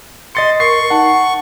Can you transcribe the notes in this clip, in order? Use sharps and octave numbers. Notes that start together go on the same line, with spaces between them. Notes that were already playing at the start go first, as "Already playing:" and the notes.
D#5 C6 A6 C#7
A#4 C#6 C7
D#4 F#5 A5